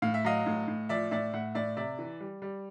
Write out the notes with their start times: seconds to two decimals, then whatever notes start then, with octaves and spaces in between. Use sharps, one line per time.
0.02 A2 F5
0.14 E5
0.24 F#3 D#5 F5
0.46 A2
0.68 A2
0.89 F3 D5 E5
1.11 A2 D5 E5
1.33 A2 E5 F#5
1.55 A2 D5 E5
1.77 C3 D5 E5
1.99 E3
2.20 G3
2.42 G3